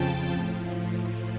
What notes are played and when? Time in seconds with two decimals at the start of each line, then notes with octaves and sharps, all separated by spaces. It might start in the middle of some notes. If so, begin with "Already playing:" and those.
Already playing: F2 C#3 F3 G5 A5
0.33 A2 F3